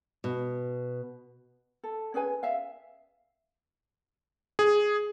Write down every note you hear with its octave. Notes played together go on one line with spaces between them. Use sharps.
B2
A4
C#4 G#4 B4 G#5
E5 F5
G#4